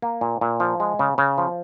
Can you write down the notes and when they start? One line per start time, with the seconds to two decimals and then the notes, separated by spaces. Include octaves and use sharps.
0.02 A#3
0.21 A#2
0.41 A#2
0.60 F3
0.80 G#3
0.99 C#3
1.18 C#3
1.38 F3